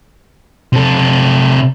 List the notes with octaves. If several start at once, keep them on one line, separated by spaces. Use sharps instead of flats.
C3 A4